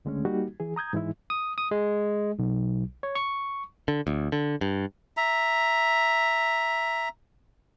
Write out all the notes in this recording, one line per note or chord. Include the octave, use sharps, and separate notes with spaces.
C#2 D3 G#3 A3 C#4
G3 A#3 D#4 F#4 G4
E3 G#4
A#5 D#6 G6 G#6
G#2 E3 G#3 D#4 E4
D#6
D#6
G#3
B1
C#5
C#6
D3
D2
D3
G2
E5 A#5